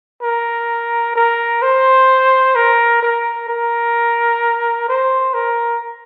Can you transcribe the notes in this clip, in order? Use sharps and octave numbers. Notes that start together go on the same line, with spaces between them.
A#4
A#4
C5
A#4
A#4
A#4
C5
A#4